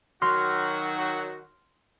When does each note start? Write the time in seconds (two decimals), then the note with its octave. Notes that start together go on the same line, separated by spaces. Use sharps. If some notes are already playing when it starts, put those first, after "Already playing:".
0.22 D#3 F#3 F#4 C6 F6 A#6